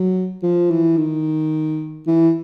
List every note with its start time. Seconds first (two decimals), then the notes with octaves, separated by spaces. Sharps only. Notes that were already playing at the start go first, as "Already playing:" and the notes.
Already playing: F#3
0.43 F3
0.70 E3
0.97 D#3
2.07 E3